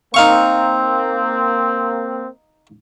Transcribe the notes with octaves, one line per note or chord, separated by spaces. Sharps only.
A#3 C4 D#4 F5 C#6